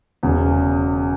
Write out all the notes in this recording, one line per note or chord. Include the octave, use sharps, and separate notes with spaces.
E1 E2 C#3